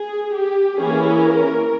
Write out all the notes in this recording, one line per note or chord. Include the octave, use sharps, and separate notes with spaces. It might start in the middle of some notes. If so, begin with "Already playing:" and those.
Already playing: G#4
G4
E3 A#3 C#4 G#4
A#4